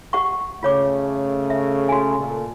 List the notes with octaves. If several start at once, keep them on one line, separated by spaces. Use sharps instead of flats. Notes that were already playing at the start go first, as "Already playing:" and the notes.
G4 F#5 C#6
C#3 A3 F4 C#5 D6
E5
F#4 G#5
A#2 A4